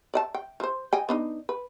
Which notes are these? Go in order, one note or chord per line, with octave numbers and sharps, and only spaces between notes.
D5 D#5 A5
G5
F3 C5
D#5 G5 G#5
B3 D4 D#4
B4